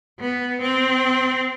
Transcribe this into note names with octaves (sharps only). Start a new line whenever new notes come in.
B3
C4